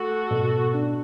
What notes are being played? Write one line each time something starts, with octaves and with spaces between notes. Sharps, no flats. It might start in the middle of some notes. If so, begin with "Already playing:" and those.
Already playing: A3 F#4 A4
B2
D4